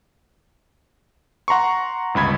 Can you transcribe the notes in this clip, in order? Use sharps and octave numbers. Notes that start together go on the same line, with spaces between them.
F#5 A#5 C6 C#6
G1 C#2 B5 G#6